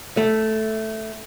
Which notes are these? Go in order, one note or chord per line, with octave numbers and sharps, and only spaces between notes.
A3